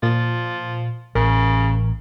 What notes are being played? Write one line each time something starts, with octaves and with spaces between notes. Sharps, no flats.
A#2 F3
A1 C#3 A#4